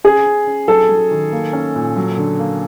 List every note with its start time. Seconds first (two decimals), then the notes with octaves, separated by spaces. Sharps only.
0.04 C#4 G#4
0.26 C#4
0.47 C#4
0.68 F#3 A4
0.89 F#3
1.11 D#3
1.32 A#3
1.53 C#4
1.75 A#2
1.96 F#3
2.18 D3
2.39 A#3